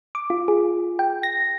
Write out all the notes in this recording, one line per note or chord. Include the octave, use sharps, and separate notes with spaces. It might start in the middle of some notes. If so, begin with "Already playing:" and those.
D6
F4
G#4
G5
A#6